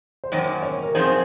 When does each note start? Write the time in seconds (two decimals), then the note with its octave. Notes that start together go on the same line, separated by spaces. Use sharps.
0.24 C5
0.32 F#2 D#3 A#3 C#4 C#5
0.63 C#5
0.83 A#4
0.95 F#2 F3 C4 D#4 G#4 C5